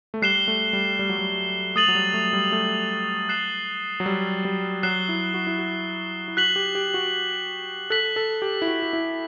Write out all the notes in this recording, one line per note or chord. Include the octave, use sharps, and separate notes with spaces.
A3
G3 F#6 C7 E7 G7
A3
G3
G3
F#3
G3
A3 D#6 A6 D#7 F#7
F#3
G3
A3
G3
A3
F#6 C7 E7 G7
F#3
G3
G3
F#3 F#6 C7 E7 G7
E4
F#4
E4
F#4
E4
F#4 F#6 B6 F#7
G4
G4
F#4
A4 F#6 B6 F#7
A4
G4
E4
F#4
F#4
E4